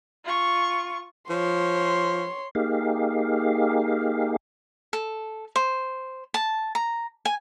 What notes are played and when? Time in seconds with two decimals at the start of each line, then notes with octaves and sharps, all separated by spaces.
0.25 F4 C#6
1.30 F3 C#5 C6
2.55 A#3 D#4 G4 G#4 F5
4.93 A4
5.56 C5
6.34 A5
6.75 A#5
7.25 G#5